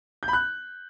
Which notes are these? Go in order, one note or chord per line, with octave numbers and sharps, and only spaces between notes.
G6
B5
F#6